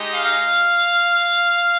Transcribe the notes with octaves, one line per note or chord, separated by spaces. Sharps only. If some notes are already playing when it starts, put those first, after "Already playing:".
Already playing: G#3 D#4 G4
F5